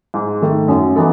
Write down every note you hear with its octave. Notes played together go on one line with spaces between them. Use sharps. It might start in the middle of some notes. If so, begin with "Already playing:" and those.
G#2
D#3 A3
F#2
E3 B3 D#4 A4